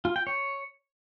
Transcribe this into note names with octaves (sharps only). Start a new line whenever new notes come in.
F4
G5
C#5